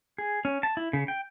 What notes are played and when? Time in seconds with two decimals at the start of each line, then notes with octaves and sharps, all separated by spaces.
0.18 G#4
0.45 C#4
0.63 A5
0.77 E4
0.93 C#3
1.08 G5